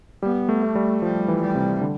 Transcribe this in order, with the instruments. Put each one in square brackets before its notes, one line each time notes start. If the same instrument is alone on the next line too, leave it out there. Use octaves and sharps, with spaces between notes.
[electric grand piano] G3 [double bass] B3
[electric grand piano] A3
[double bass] A3
[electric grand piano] G3
[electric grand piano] F3 [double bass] G3
[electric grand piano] E3
[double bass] G3
[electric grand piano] C3
D3